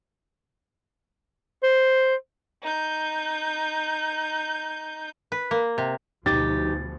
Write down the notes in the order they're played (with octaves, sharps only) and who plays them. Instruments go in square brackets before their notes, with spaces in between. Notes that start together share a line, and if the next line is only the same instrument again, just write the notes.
[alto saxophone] C5
[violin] D#4 G6
[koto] B4
A#3
C3
[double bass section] D2 B2 F3 [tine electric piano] D#4 [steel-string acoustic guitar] G4 [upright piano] A6